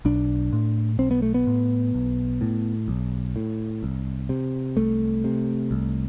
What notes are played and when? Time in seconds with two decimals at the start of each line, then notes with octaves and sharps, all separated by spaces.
0.05 B1 D4
0.53 A2
0.99 B1 C4
1.11 B3
1.22 A3
1.34 B3
1.47 A2
1.94 B1
2.41 A2
2.88 B1
3.36 A2
3.83 C2
4.29 C3
4.77 C2 A3
5.24 C3
5.71 C2